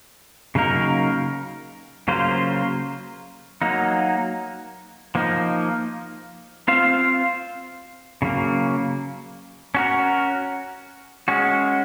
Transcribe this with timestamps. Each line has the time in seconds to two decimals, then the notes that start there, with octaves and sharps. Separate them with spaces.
0.55 C#3 F#3 A#3 D#4 A#4
2.08 C#3 F#3 A#3 F4 C5
3.62 F#3 A#3 D#4
5.15 F3 A#3 D#4
6.68 C4 F4 C5 F5
8.22 C#3 F#3 A#3
9.75 C#4 F#4 A#4
11.28 G#3 C#4 F#4